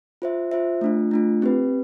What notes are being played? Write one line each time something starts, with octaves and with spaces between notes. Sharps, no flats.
F4 C5 E5
F4 C5 E5
A3 D4 F4
A3 D4 F4
C4 G4 B4